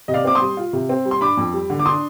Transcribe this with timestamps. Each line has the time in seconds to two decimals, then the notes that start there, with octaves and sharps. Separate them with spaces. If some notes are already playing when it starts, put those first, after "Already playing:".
0.08 C3 D#5
0.14 D5 F5
0.24 C4 D6
0.35 C6 D#6
0.41 G3
0.57 F4
0.73 C3
0.89 C4
1.05 G3
1.11 C6
1.21 D4 B5 D6
1.37 F2
1.53 G3
1.70 D3
1.80 D6
1.86 D4 C6 D#6